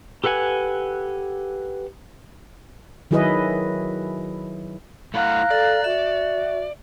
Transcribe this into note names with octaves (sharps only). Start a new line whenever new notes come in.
G4 A4 B4 F#5 G#5
D#3 F#3 E4 G#4 B4 D#5
A3 E4 F5 F#5 A#5 F#6
A4 D5
F#4 E5